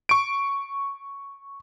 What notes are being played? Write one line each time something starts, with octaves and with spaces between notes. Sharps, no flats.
C#6 D7